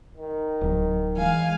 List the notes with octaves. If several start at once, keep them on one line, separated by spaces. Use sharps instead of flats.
D#3
D1 F#3
E3 G#3 F5 G#5